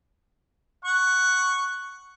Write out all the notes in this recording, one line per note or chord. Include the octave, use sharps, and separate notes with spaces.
F#5 C#6